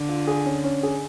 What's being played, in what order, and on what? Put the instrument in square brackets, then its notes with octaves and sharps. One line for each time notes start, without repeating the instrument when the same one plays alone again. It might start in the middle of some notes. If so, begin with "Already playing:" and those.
Already playing: [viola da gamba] D3
[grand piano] F4
G#4
C#4
C#4
G#4